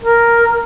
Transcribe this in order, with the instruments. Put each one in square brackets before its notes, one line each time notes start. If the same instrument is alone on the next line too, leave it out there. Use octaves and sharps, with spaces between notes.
[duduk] A#4